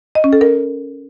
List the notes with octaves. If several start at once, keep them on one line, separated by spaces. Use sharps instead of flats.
D#5
C#4
A4
A#4